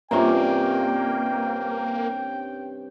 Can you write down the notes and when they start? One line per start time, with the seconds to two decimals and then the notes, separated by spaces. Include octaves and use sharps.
0.11 G2 C3 A#3 C#4 F4 G5 A#5